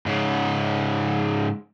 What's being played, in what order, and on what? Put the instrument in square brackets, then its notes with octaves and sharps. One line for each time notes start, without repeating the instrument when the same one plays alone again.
[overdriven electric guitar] G#2 C#3